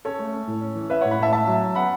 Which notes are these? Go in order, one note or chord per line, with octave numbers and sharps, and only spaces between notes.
C#4 A4 C#5
A3
C#4
A2
C#4
E3
C#4 B4 E5
A2 C#5 F#5
F#5 B5
A2 E5 A5
C#4 E5 A5
F#3
C#4
B3 F#5 B5